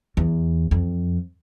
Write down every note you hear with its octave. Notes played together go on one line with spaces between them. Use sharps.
E2
F2